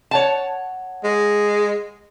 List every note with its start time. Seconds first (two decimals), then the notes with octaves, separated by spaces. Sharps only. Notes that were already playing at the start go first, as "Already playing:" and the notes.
0.11 C#5 F#5 A5
1.04 G#3